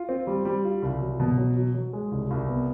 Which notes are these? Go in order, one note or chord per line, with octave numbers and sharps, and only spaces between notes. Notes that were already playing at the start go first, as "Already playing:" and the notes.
Already playing: F4
C4
G3
G3
F4
C2
F#3
B2
F#3
F#3
F#3
G#3
C2
C2
B3